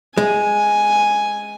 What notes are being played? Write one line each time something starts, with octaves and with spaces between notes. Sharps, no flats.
G#3 G#5